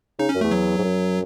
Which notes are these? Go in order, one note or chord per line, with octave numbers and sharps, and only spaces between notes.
C#3 D#4
C#4
F#2
E2 A3
F#3
G#2
F#2